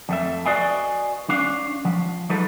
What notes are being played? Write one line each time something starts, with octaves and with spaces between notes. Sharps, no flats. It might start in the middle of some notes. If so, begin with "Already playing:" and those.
F2 A3 E5
F#4 B4 D5 D#5 F5 G#5
C#4 D4 F5
F3
F3 F#3 G#3 D#4 A4 B4